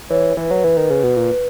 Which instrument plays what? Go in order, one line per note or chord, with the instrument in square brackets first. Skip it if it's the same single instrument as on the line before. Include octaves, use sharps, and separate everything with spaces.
[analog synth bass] E3 [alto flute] C#5
[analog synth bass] E3 [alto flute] B4
[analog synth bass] F#3
E3
D#3
C#3
B2
A#2